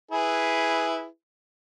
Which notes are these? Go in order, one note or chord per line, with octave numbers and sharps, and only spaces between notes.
E4 G#4 B4